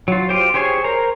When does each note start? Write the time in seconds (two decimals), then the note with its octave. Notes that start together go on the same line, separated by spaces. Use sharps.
0.08 F#3 F4
0.29 F4 G4 C5
0.54 G4 G#4 C5 C#5 G#5
0.84 A#4 C5 A#5